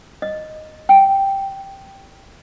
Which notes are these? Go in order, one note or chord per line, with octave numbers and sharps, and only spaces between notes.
D#5
G5